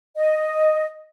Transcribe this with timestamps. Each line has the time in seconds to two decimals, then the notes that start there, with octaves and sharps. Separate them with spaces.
0.16 D#5